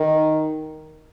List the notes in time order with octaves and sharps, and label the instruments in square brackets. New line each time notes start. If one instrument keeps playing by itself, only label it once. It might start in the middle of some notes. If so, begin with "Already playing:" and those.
Already playing: [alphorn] D#3